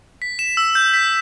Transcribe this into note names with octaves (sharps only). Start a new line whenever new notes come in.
B6
E7
E6
G6
B6